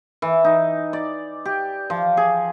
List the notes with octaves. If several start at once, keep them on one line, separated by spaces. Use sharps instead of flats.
E3
D#4
D5
G4
F3
G#4